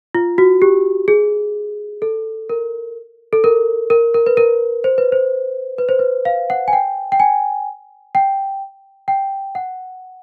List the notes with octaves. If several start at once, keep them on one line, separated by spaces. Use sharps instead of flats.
F4
F#4
G4
G#4
A4
A#4
A4
A#4
A#4
A#4
B4
A#4
C5
B4
C5
B4
C5
B4
F5
F#5
G#5
G5
G5
G#5
G5
G5
F#5